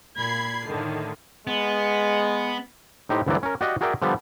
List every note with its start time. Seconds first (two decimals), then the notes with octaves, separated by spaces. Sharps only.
0.16 A#2 B5 G#6 C7
0.69 A2 D3 D#3
1.47 G#3 B3
3.09 A2 D#4 G4 C5
3.26 D2 G2 D3 E3 F#3 D5
3.43 C#4 A#4
3.61 F#4 G4 D5 D#5 F5 F#5
3.81 F#4 G#4 A#4 D5 E5 G5
4.02 D3 F3 G3 B3